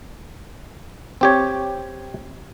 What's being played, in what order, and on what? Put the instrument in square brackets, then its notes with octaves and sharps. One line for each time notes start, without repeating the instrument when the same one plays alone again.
[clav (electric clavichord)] C4 G4 C#5